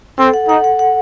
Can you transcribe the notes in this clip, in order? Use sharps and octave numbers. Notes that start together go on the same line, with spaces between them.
C4 A4
F#5
D#4 F#5
F#5
F#5